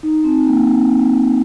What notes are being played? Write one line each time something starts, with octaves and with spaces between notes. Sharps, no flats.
D#4
C4
A#3
C4